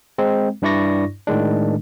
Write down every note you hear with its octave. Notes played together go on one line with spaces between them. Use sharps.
G#3 C4
G2 D4 E4 D5 C#6 A#6
A2 D#3 G#3 D4